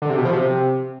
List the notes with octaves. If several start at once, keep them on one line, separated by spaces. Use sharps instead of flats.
D3
C3
B2
F3
C3